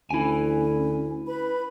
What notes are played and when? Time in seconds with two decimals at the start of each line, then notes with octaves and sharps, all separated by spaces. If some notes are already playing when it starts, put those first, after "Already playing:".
0.11 D2 C#4 E4 G#5
1.27 B4 B5